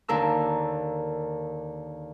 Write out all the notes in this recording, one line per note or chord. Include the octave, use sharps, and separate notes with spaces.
D#2 D3 A#4 E6